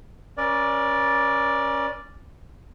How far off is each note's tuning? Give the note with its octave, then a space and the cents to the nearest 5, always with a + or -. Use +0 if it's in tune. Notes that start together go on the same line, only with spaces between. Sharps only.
C#4 +0 A#4 +40 D5 +0